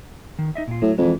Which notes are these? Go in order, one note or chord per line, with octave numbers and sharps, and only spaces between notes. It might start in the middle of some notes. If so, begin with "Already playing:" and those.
D#3
D#4 D#5 E5
A#2 F4
A2 F#3
F2 E3 G#3